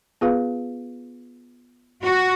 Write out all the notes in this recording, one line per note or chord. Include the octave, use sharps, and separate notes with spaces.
B3 F4 G#4 B4 F5
F#4